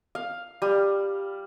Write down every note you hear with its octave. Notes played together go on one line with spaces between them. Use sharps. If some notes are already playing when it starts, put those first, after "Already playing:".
F5
G3